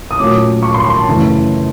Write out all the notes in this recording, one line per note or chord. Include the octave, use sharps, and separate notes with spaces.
D#6
A#2 F#3 A3 C#4 D6
C#6
C6
C6
A5
F#2 C#3 E3 A3